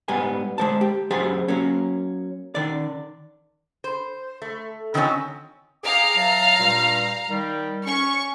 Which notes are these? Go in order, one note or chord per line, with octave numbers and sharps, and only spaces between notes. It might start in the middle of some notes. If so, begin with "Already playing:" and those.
G#2 G3 B3 G#5
G#3 C5 A5
G4
F#2 G4 G#4 C5 G#5
F#3 A#3 C#4
D#3 D5
C5
A3
D3 D#3 F3 A#3 C4 C#4
G#4 F5 G5 A#5 D6
E3 F#3 A5
G2 A#2 G3
D#3 G3
C#4 C#6